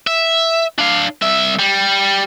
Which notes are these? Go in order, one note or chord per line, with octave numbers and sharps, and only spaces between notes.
E5
D4 F5
C2 E5
G3